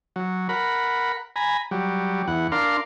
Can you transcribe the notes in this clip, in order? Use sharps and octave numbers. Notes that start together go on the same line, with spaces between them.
F#3
A#4 F#5 B5
G#5 A#5 B5
F#3 G3
E2 F#5
D4 A#4 F5 C6